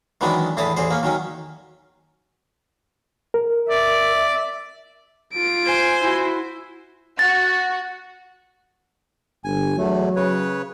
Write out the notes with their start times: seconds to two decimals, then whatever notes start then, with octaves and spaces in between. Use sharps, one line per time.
0.21 D#3 E3 F#3 G#3 B3 D4
0.57 E2 A2 E4 A5 D#6
0.77 A1 E2 G#4 C5
0.90 A#3 C#4
1.03 D#3 F#3 C#4
3.34 A#4
3.70 D5 E5
5.34 F4 D7
5.66 C5 G#5
6.01 E4 F#4
7.19 F#4 A6
9.44 G1 G#5
9.78 E2 F#3 A3
10.16 C#3 B4 C#5